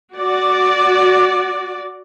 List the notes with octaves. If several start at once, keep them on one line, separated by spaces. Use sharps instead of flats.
F#4 D5